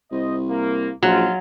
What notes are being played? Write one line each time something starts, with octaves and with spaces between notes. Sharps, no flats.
C2 C5 D#5
A#3
A#1 F#3 G#3 D#4 F4